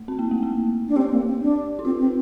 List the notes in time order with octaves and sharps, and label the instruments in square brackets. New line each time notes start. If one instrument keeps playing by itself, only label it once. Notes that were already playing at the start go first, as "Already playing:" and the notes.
Already playing: [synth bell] A3
C4
A#3
A3
A#3
[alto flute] D4
[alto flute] C4 [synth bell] G4
[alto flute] A#3
C4
D4
[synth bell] D#4
[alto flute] C4 [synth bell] F4
[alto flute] C4